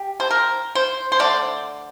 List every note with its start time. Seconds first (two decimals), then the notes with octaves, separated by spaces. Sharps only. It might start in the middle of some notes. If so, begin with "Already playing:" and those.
Already playing: G4
0.20 C5
0.31 A#4
0.75 C5
1.12 C5
1.19 D3 A3 D5